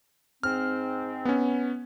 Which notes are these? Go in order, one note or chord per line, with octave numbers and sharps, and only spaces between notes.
G#2 C4 F6
B3 C#4